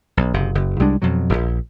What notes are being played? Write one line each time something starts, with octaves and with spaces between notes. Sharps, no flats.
B1
F#1 C3
F#1
C2 G3 G#3 D4
F2 B2 F#3
D#1 A#1